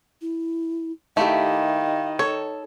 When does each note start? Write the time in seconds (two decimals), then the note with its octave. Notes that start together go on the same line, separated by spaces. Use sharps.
0.22 E4
1.17 D#3 A3 E4 G4 F5
2.19 A4 C#5